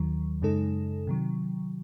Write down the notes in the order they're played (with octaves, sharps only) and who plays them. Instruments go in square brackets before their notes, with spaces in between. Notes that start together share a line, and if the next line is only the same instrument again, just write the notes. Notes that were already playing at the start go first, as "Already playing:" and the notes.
Already playing: [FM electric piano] D#2 D#3 F#3
F#2 C#3 G#3 D#4 A4
C3 D#3 F#3